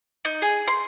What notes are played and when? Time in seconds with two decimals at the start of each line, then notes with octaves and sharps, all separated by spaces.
0.25 D#4
0.42 G#4
0.68 C6